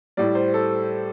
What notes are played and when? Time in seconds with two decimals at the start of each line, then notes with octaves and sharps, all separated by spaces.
0.17 A2 G3 D5
0.35 C5
0.54 A4